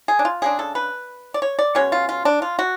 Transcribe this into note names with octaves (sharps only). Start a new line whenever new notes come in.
G#4
D4
F4
C#3 G#3 D4 G#4
A4
B4
D5
C#5
D5
B2 G#3 C#4 C#5
F4
F4
D4
F4
F#4